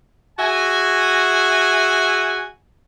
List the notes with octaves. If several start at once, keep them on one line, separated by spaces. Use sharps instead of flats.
F#4 G#4 E5 G#5